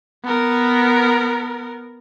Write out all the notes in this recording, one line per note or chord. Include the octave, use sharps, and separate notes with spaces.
B3 A#4